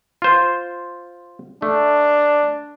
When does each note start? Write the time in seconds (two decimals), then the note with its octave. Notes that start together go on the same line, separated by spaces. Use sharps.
0.22 F4 C5
1.62 A3 D4